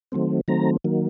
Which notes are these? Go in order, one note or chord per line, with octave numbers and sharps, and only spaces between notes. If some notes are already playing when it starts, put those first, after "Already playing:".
D#3 F#3 A3 C4
D#3 F#3 A3 C4 A#5
D#3 F#3 A#3